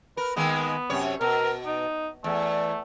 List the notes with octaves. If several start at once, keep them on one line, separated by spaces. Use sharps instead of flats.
A#4 B4
D#3 G#3 A#3 B3
F#2 C3 C#5
B2 A#4
D#4
E2 A3